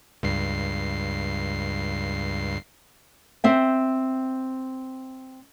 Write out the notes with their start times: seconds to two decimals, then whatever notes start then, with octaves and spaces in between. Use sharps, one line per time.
0.23 C#2 G2 C7
3.44 C4 E5 G5